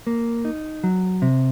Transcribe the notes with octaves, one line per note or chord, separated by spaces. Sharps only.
A#3
D#4
F#3
C3